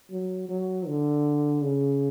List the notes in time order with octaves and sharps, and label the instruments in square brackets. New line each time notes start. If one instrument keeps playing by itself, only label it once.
[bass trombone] F#3
F#3
D3
C#3